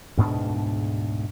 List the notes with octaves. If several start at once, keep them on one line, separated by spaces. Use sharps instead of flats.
D2 G#2 B2 D4